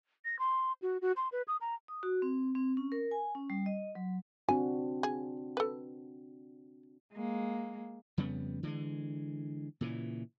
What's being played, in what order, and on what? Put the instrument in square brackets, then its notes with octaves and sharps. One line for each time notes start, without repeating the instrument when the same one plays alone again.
[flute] A#6
C6
F#4
F#4
C6
B4
D#6
A#5
[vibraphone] D#6
F#4
C4
C4
C#4
A#4
G#5
C#4
G3
D#5
F#3
[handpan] C4 D4 F#4 [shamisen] G#5
[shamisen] G#4
A4 B4
[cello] G#3 A#3
[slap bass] F2 C#3 G3 B3
D3 E3 G3 G#3
A#2 C#3 E3